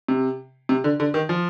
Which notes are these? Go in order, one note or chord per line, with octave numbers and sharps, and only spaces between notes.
C3
C3
D3
D3
D#3
F3